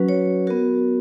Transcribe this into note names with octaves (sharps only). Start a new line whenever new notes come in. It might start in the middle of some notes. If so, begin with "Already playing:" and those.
Already playing: F#3 C#4 F#4 B4
C#5
B3 F#4 A#4